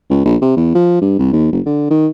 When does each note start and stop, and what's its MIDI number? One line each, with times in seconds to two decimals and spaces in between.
0.10 0.24 37
0.25 0.36 34
0.42 0.52 48
0.56 0.74 40
0.75 0.99 53
1.02 1.15 43
1.19 1.32 36
1.33 1.48 39
1.52 1.61 30
1.66 1.88 50
1.90 2.08 51